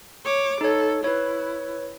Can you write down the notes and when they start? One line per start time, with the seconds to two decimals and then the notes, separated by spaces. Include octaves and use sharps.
0.25 C#5 D6
0.61 D#4 A4 C#5
1.04 E4 B4 C#5